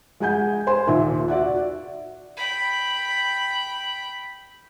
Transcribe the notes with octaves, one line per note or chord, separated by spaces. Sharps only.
G#3 F#5 G#5 G6
C5 G#5 C6
D#2 A#2 E5
F#4 D5 E5 F#5
G5 B5